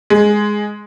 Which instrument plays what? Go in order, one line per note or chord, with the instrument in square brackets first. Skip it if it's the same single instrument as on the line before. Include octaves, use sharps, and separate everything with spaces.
[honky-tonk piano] G#3